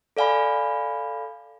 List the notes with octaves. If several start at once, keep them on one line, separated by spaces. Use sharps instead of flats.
A4 D5 F5 G#5 B5